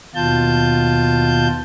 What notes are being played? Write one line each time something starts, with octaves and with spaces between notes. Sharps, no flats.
D#2 B2 F4 A5 G6